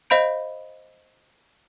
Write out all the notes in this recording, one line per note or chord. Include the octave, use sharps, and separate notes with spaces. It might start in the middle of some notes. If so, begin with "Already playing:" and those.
C5 D#5 F5 B5 G6 D7